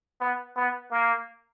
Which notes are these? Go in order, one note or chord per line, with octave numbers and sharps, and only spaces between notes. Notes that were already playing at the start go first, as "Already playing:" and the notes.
B3
B3
A#3